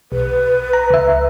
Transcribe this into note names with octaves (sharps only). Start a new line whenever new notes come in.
B1 B4
A#5
C#2 E5